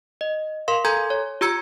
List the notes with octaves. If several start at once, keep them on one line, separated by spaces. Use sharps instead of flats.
D#5
A#4 F5 C6
A4 G#5 A#5 C6 G6 G#6
C#5
F4 G4 A#5 E6 G#6 C#7